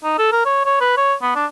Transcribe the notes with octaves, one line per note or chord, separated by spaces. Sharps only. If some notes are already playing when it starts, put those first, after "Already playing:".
D#4
A4
A#4
C#5
C#5
B4
C#5
B3
D4